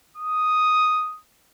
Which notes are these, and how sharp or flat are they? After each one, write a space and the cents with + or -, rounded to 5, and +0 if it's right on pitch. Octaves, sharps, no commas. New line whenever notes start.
D#6 +0